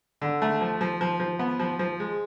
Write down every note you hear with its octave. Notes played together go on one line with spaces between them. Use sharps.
D3
A3
F3
F3
F3
F3
B3
F3
F3
G#3